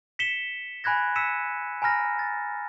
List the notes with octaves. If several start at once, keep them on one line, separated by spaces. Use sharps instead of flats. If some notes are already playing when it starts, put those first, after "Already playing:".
B6 C#7 E7 G7
G#5 B5 F#6 G#6 A#6
E6 B6 C#7 D#7 E7
G#5 A#5 B5 F6 A#6
A6